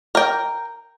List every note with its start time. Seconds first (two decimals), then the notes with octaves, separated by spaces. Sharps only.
0.15 A#4 G5